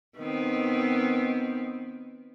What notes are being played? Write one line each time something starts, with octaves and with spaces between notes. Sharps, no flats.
D#3 B3 C4